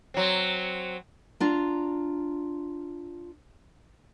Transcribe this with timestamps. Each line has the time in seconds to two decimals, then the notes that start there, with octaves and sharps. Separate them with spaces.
0.14 F#3 C4
1.40 D4 F4 A#5